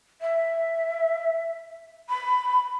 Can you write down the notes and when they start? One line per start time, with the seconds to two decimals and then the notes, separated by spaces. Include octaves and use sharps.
0.21 E5
2.09 B5